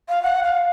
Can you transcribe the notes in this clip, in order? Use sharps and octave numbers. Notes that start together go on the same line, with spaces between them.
F5
F#5
F5